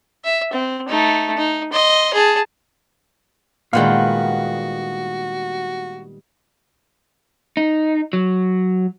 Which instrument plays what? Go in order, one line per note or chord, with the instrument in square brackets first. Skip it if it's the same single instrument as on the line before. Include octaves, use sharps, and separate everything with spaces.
[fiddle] E5
C4
A3 D#4
D#4
D#5 C6
G#4 A5
[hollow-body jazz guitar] A#2 G#3 [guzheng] D#3 G3 B3 [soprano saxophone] F#4 [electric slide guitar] F5 F#5
[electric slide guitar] D#4
F#3